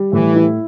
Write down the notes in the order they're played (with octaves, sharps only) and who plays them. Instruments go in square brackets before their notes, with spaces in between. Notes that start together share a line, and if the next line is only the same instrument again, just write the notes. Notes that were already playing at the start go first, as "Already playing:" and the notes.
Already playing: [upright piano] G3
[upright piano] A2 [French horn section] E3
[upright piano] E4